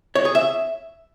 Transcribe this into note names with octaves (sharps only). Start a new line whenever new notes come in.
C#5
G#4
E5